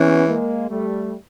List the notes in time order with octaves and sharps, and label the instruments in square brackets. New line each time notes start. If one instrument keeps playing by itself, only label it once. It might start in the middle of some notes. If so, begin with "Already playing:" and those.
Already playing: [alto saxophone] E3 [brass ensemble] B3 C#4
[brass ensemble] G#3 A#3
G3 A3